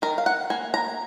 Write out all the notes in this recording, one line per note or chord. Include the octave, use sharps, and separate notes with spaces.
D#3 A#4
F5
F#5
A#3 G#5
A#5